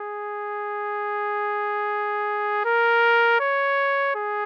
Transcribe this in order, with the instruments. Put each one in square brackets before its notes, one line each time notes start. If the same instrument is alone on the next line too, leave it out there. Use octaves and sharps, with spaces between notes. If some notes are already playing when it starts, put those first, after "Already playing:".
Already playing: [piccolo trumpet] G#4
A#4
C#5
G#4